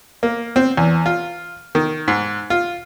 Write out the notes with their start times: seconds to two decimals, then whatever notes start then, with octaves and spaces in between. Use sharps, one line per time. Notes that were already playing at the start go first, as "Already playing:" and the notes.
0.23 A#3
0.56 C4
0.77 E2
1.06 F4
1.75 D#3
2.08 G#2
2.50 F4